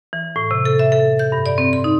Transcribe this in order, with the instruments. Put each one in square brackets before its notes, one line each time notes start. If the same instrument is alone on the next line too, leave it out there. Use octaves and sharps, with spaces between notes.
[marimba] E3
A2
C3
A4
E5
A4
G6
G2
D5
C4
C6
D#4